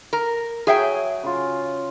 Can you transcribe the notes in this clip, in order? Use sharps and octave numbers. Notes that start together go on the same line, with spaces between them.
A#4
F#3 G#4 E5 G5
C#3 F4